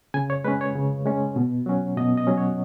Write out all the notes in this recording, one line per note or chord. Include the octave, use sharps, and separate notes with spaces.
C#3 G#5
C#5
G#3 C#4 B4
C#5
C#3
G#3 C#4
B2
F#3 C#4
B2 D#5
D#5
F#3 C#4
C#5